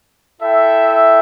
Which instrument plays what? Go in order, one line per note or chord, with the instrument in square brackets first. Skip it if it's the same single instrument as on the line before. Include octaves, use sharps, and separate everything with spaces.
[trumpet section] E4 A4 E5 G5